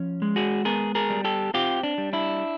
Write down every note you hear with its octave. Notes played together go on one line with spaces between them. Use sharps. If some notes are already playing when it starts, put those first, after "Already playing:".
Already playing: F3 C#4
G#3
F#4 G#4
B3 G#4 A#4
G#4 A#4
G3
G4 A4
C4 F4 G4
D4
G3
D4 E4